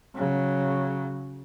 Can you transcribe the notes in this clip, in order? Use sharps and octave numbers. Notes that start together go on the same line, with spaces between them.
C#3 F#3